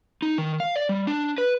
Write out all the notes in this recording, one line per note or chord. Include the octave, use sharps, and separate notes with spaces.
D#4
D#3
F5
D5
G3
D4
B4